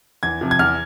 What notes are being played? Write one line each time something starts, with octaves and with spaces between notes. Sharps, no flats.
E2 G#6
C3 F3
G#6
E2 F6